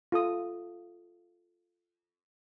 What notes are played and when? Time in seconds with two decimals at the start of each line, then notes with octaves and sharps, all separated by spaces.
0.12 F4 A4 D#6